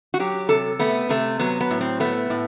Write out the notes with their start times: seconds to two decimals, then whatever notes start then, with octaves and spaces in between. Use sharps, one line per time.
0.14 F#4
0.20 F#3 G4
0.49 C3 A4
0.80 A3 B3
1.09 C3 A3
1.39 F#3 B3
1.61 B3
1.71 A2
1.81 C4
2.00 A3 B3
2.30 A2